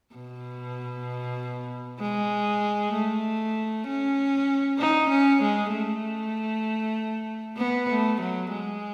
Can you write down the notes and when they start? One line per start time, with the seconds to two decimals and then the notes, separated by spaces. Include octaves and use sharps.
0.15 B2
2.00 G#3
2.93 A3
3.87 C#4
4.79 D#4
5.09 C#4
5.42 G#3
5.71 A3
7.57 B3
7.89 A3
8.20 F#3
8.51 G#3